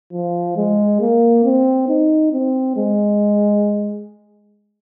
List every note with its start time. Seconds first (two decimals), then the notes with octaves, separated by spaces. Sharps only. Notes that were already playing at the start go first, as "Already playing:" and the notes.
0.13 F3
0.57 G#3
1.00 A#3
1.44 C4
1.88 D#4
2.32 C4
2.77 G#3